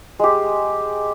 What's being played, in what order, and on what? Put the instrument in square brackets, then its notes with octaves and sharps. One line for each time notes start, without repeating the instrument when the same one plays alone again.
[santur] G#3 G4